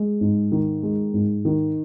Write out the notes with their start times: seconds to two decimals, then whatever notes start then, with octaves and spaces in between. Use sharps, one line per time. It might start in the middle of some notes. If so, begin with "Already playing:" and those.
Already playing: G#3
0.21 G#2
0.52 D#3
0.83 G#3
1.14 G#2
1.45 D#3